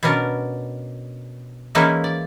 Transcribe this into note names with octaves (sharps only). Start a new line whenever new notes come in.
B2 B3 C#4 D4 A#4
E3 G#3 A#3 C#4 D#4 E4
D5